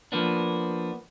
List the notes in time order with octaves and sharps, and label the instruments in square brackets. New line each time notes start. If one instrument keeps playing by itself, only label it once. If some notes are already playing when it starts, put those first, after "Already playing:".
[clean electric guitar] F3 A#3 B3 D4